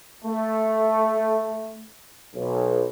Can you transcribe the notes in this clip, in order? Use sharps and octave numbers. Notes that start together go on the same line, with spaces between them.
A3
B1